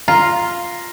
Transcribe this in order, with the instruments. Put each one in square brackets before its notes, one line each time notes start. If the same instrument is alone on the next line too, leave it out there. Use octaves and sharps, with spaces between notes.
[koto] F4 [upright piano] A#5